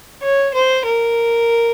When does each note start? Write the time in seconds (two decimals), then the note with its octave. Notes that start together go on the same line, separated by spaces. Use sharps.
0.22 C#5
0.54 C5
0.85 A#4